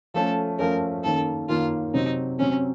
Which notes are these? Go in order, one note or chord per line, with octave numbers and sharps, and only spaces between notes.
F3 A3 C#4 A4
F3 A3 C#4 A#4
F#2 D#3 A#3 C#4 A4
F#2 D#3 A#3 C#4 F4
C3 F#3 C4 D#4
C3 F#3 C4 C#4